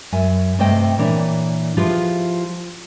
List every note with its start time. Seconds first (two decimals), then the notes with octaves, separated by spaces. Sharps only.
0.12 F#2 E5 G#5
0.58 G2 C3 A3 C5 D#5 G5
0.98 A#2 E3 D4 C#5
1.77 F3 E4 F4 G4 G#4 B4